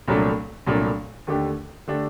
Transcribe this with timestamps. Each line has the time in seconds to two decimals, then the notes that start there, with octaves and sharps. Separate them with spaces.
0.08 C2 A#2 F#3 A3 D4
0.66 C2 A#2 F#3 A3 D4
1.27 D#2 D3 A3 D4 G4
1.87 D3 A3 D4 G4